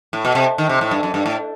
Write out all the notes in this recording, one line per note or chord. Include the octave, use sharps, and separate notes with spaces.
A2
B2
C3
D#3
C3
A2
G2
F#2
G2
A2